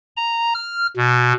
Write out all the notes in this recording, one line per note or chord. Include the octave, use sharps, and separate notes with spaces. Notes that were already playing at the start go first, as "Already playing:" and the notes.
A#5
F6
B2